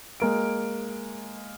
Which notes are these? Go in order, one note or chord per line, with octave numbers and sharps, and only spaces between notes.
G#3 A#3 D7